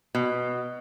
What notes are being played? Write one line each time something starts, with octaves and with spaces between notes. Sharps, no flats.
B2